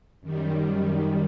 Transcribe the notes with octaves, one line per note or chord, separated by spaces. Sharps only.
F#2 D#3 G3